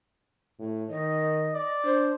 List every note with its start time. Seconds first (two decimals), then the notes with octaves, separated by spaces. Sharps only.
0.59 A2
0.90 D#3 D#5
1.54 D5
1.85 D4 C5